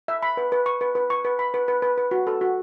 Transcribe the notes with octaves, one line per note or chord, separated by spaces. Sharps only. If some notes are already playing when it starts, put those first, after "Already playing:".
E5
B5
B4
B4
C#6
B4
B4
C#6
B4
B5
B4
B4
B4
B4
F#4
A4
F#4